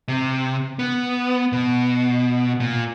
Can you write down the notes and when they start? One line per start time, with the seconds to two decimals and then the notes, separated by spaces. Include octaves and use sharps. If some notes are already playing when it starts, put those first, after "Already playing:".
0.08 C3
0.79 B3
1.53 B2
2.60 A#2